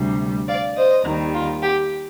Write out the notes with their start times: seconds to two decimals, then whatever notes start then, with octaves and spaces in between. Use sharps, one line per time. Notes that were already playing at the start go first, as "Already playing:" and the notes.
Already playing: D2 C3 G3
0.47 D5 F5
0.76 C5 D#5
1.04 D#2 D#3 G3
1.34 F4
1.62 G4